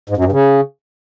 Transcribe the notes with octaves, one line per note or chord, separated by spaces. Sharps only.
G#2
F#2
G2
C#3